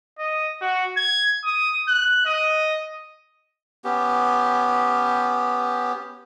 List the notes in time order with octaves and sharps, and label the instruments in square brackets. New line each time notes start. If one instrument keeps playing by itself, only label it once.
[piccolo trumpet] D#5
F#4
G#6
D#6
F#6
D#5
[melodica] B3 C#4 G4